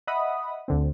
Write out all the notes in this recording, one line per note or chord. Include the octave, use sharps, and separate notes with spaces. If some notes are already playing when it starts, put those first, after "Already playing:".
D#5 E5 F#5 B5 D#6
D2 D3 C4